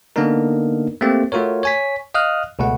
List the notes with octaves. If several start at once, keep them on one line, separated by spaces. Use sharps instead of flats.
D3 A#3 B3 D4 D#4 A#4
A3 A#3 C4 G4
A3 F4 F#4 A#4 C#5
C#5 G#5 B6
D#5 F5 D#6 F6 F#6
C#2 B2 A3 F#5